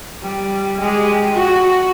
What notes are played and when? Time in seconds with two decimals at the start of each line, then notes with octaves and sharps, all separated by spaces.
0.22 G3
0.80 G#3 G4
1.34 F#4